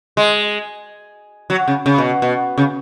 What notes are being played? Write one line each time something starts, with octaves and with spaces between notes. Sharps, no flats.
G#3
F#3
C#3
C#3
B2
B2
C#3